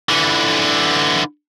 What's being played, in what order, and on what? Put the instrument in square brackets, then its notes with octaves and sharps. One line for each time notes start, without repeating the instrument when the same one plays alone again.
[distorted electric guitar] D3 E3